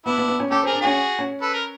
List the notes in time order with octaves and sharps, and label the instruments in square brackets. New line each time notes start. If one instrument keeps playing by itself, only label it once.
[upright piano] B3 [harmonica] D4 E4
[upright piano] B3
B3
C#4
[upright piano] C#4 [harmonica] G4 A4
[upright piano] C4 [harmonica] G#4 A#4
[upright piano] D4
[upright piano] C#4 [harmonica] F#4 G#4
[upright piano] C#4
[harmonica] A4 B4
A#4